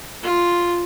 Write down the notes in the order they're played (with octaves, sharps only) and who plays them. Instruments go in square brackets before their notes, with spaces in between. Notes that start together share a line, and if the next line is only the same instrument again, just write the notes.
[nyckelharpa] F4